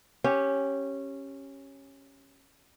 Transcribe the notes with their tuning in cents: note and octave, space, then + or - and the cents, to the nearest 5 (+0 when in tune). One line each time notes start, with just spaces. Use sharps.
C#4 -10 G4 +0